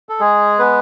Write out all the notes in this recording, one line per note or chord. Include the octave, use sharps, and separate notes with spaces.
A4
G#3 G#4
B3 B4